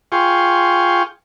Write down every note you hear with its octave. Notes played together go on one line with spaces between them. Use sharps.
F4 G#4 G5 C6 C#6